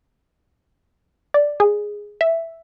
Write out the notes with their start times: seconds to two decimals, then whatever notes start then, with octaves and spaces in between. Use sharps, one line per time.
1.34 D5
1.60 G#4
2.21 E5